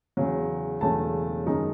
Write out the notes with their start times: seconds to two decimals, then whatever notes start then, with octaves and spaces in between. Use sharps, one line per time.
0.17 E2 C#3 F#3
0.81 E1 E2 C#3 F#3 A3 A5
1.47 F#2 D#3 G#3 D#4